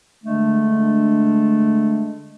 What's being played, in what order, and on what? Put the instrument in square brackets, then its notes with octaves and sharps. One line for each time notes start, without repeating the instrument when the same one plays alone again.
[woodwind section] D3 G#3 A3 D4